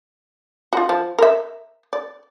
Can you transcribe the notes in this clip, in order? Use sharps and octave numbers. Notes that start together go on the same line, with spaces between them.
F4 F#4
F3
A#4 E5
D5